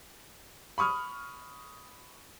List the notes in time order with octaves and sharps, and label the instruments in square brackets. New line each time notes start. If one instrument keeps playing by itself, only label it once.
[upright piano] B5 C#6 D#6 F6